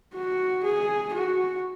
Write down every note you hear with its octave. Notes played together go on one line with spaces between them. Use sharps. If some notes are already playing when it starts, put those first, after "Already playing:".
F#4
G#4
F#4